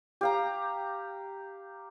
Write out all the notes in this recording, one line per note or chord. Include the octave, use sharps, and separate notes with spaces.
G4 F5 A#5